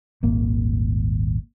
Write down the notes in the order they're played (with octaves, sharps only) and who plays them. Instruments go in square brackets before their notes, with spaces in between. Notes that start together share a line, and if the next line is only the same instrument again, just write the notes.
[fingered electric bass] D#1 G#1 A#3